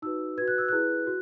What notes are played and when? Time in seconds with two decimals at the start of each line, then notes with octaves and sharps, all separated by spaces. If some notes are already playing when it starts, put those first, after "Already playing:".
0.02 D#4 F#4 B4 E6
0.37 F#4 B4 G#6
0.48 F#6
0.58 E6
0.69 E4 G#4 B4 F#6
1.07 F#4